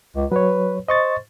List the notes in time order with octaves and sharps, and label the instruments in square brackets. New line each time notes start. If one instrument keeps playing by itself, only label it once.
[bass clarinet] C#2
[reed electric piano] F#3 C#5 [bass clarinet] B4
[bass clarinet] C5 [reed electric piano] D#5 C#6 A6